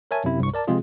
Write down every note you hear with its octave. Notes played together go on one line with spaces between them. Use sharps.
A#4 C#5 E5 G#5 A5
F#2 C3 E4
C2 G2 C#6
A#4 D5 A5
C3 F3 G#3 C4 F4 G#4